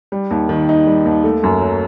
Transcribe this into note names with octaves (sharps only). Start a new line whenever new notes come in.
G3
D#2
D#3
D#4
G3
D#2
A3
F#2
F#3